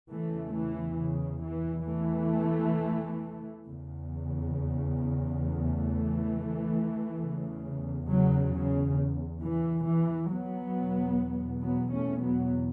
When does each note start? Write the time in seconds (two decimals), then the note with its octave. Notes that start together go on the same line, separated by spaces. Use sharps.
0.11 E2 C#3 E3 A3
0.55 E3
1.00 C#3
1.45 E3
1.88 E3 A3
3.66 E2 C#3
5.43 E3 A3
7.20 E2 C#3
8.09 C#3 F#3
8.54 C#3
9.42 E3
9.86 E3
10.30 F#3 B3
10.74 E2 B2
11.63 F#3 B3
11.93 A3 C#4
12.22 F#3 B3